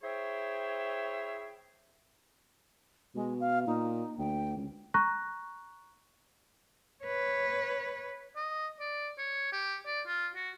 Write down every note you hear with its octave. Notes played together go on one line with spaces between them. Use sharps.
E4 G#4 C5 C#5 E5 G5
B2 G#3
F5
A#2 D#4
D2 G5
C#2
A#5 C#6 F#6 A#6
B4 C#5
D#5
D5
C#5
G4
D5
F4
F#4